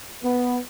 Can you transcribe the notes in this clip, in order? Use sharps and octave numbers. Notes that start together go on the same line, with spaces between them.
B3